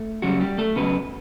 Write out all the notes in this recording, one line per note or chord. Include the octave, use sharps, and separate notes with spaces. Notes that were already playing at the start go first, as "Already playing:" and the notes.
Already playing: A3
C#3 F#3 G3 F#4
G3 G4
A3 A4
C#3 F#3 B3 B4